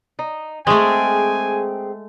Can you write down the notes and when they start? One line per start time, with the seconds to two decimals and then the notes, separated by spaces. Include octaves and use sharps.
0.19 D#4
0.67 G#3 A3 C4 G#4 G#5